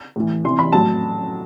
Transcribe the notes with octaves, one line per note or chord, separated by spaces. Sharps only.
A2 E3
C3 E3 C6
B5
A2 F#3 A5